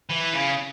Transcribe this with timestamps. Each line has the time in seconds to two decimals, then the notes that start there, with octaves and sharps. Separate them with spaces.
0.10 E3
0.33 C#3